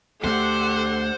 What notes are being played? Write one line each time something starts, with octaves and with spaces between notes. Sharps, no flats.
D2 D3 G#3 A3 G4 A4 C5 F#5